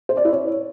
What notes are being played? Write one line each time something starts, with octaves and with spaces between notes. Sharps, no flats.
C5
D5
E4
C#5